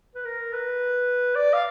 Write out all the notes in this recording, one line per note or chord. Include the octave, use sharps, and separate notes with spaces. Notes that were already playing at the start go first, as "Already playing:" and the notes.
B4
A#4
B4
D5
F5